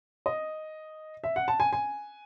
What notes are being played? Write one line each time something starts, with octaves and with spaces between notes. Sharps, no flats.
D#5
E5
F#5
A5
G#5
G#5